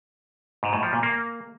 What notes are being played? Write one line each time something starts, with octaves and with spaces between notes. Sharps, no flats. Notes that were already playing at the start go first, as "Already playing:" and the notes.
G#2
A2
F3
A#2
A#3